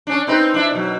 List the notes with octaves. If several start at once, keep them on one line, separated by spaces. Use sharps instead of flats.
C#4 D4
C4 D#4 B4
D4 E4
B2 F#3